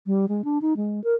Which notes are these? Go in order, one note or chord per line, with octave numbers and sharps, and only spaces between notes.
G3
G#3
D4
D#4
G#3
A#4